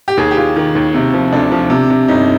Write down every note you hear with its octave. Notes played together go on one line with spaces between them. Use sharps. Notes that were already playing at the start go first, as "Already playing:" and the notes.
G4
D#2 G#4
G4
D#2 F4
D#3
D#2
C3
F3
D2 D4
F3
C3
C3
G1 D#4